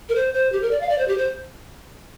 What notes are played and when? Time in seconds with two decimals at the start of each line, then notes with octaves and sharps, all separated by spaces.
0.09 A#4
0.15 C5
0.34 C5
0.52 G4
0.62 A#4
0.71 D5
0.81 F5
0.89 D5
0.98 C5
1.08 G4
1.18 C5